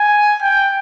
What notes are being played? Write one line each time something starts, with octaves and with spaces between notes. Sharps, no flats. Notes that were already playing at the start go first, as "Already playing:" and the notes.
Already playing: G#5
G5